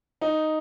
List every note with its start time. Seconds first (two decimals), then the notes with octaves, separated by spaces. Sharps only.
0.21 D#4